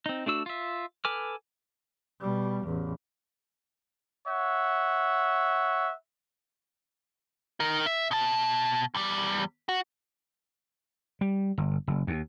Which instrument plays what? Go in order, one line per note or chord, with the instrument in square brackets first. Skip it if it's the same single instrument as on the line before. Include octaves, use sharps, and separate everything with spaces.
[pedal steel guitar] C4 D#4
A3 D4 F#4 E6
F4 E5
A4 B4 G#5 D6 F6
[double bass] B2 G3
A1 E2
[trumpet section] C#5 E5 F#5
[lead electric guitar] D#4 A#4
E5
B2 A5
E2 G3
F#4
[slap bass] G3
G1
F#1
D#2